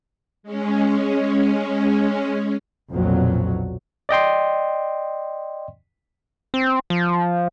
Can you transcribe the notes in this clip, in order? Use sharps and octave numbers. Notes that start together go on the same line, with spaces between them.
G#3 C#4
B1 F2 A#2 F#3
D5 D#5 G5 C6
C4
F3